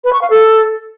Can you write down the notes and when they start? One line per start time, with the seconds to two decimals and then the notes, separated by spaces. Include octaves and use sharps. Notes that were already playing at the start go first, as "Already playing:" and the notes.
0.04 B4
0.13 C#6
0.21 F5
0.30 A4